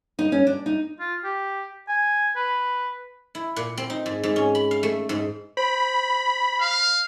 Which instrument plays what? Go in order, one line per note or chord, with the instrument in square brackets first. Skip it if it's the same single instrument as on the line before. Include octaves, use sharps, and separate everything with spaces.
[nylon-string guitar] D#4
C#4
D4
D#4
[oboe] F4
G4
G#5
B4
[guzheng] E4
A#2
C4
D#4
G#2
G#2
C#4
B5
F5
A3
G#2
[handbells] C5 [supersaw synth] B5
[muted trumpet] F5